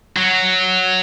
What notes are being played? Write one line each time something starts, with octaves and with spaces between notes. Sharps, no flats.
F#3